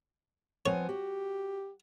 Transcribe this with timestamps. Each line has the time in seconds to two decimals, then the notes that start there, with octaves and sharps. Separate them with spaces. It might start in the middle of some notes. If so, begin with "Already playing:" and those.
0.66 F3 B3 C4 C#5 G#5
0.89 F#4 G4